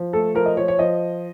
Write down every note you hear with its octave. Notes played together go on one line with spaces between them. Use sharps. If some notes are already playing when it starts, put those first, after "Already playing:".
Already playing: F3
A3 A4
F3 A#4
D#5
F3 C#5
C#5
F3 D#5